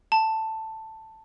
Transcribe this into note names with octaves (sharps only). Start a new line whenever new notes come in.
A5